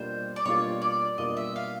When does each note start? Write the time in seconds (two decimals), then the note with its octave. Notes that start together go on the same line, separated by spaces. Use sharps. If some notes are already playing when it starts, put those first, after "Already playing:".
Already playing: B2 G3 A#3 D4 F4 C5
0.36 D5
0.45 B2 G3 A#3 D4 F4 C#5
0.82 D5
1.18 B2 G3 A#3 D4 F4 D#5
1.37 E5
1.56 F5